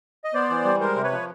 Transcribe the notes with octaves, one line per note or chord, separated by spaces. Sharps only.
D#5
B3 C5 D5
E3
G3
G#3 A#4 C5
C3
B4 C#5
F3